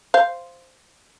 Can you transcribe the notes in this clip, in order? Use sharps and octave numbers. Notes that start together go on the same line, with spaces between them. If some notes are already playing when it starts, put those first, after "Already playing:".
C5 F5